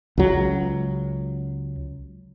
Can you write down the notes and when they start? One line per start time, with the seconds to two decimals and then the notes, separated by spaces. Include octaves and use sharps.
0.18 C#2 F#3